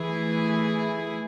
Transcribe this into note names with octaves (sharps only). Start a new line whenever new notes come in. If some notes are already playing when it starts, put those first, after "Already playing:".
Already playing: E3 A3 E4 G#4